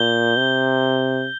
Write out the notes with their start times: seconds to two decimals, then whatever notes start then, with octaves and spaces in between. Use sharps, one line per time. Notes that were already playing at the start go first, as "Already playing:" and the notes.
Already playing: A#2 G6 G7
0.37 C3